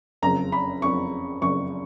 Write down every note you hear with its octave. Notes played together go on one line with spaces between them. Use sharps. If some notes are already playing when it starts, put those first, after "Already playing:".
F#1 F2 C#3 A#5
B5
F#1 F2 C#3 C#6
F#1 F2 C#3 C#6